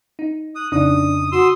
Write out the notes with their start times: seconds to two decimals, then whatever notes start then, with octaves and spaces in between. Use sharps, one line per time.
0.19 D#4
0.55 D#6 F#6
0.72 F2 C#3 D4 D#4 D#6
1.32 F#4 C6 D#6 E6